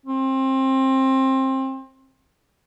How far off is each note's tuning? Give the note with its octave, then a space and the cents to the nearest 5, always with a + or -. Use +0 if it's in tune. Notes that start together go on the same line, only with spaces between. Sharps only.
C4 +25